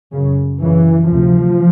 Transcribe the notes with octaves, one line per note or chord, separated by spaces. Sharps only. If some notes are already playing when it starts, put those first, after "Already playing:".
F#2 C#3
F#2 C#3 E3
D2 C3 F3